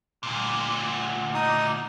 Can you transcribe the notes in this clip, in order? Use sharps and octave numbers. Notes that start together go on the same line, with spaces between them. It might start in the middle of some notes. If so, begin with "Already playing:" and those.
D2 A#2
D#4 D#6